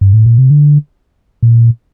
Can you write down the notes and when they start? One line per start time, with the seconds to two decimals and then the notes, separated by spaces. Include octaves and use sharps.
0.01 G2
0.13 A2
0.26 A#2
0.38 C3
0.50 D3
1.43 A#2